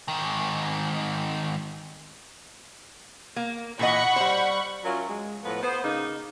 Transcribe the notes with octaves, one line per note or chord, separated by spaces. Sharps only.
G#2 D#3
A#3
A#2 E3 D#5 F#5 B5 C#6
G3 C5
F#3 C#4 E4 F4 A#4
G#3
A2 F3 B3 B4
B3 C5
C#3 A#3 D#4